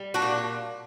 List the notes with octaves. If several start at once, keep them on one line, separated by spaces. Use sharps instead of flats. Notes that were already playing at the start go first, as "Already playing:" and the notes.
Already playing: G3
D4 F#4
A#2